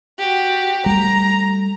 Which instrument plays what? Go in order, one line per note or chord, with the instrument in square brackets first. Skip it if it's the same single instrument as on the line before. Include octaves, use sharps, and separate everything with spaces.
[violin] F#4 G4
[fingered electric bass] G3 A3 [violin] A#5